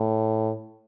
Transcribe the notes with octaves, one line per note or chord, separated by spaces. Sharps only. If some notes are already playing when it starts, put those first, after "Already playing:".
Already playing: A2